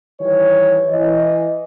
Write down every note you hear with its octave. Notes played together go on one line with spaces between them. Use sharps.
D#3 E3 G3 C#5
E3 D#5